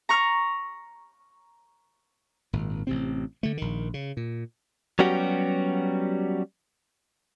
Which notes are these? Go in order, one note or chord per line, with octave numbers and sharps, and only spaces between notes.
A#5 C#6 F6
G#1 A#2
A1 C3 C4
D3 A3
A#1 D#3
C#3
A#2
F#3 G3 B3 C#4 F#4 G4